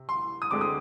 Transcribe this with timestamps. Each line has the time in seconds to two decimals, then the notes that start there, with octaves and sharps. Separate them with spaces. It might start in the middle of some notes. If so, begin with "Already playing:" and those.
Already playing: C3
0.09 C6
0.42 D#6
0.51 D2 D3 G#3 C4 D6
0.61 D#6